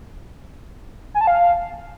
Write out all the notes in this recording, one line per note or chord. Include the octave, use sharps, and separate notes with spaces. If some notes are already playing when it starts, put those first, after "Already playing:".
G#5
A5
F5